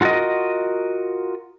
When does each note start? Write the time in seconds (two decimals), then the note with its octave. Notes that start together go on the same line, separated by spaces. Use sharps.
0.01 F4 F#4 A4 A#4 D#5